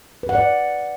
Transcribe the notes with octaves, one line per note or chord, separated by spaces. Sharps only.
B4
F#5
D5